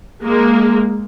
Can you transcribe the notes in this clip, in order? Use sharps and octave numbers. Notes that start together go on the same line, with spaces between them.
G#3 A#3